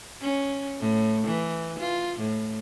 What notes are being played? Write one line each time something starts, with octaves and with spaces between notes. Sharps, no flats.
C#4
A2
E3
F4
A2